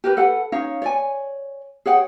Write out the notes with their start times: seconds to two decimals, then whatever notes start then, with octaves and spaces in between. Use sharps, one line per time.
0.04 G4 A#4 B4
0.17 A4 B4 F#5
0.52 C#4 D#4 C#5 F5
0.82 C#5 D5 G#5
1.86 G#4 C#5 F#5 G5